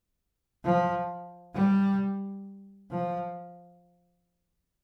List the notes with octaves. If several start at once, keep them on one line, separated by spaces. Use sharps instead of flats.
F3
G3
F3